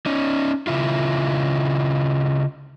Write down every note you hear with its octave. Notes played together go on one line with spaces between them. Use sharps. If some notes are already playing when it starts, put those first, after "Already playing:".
C#4 D#4
C#3 E4 F4